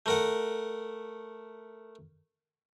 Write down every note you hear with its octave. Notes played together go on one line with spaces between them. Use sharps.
A3 A#4 F#5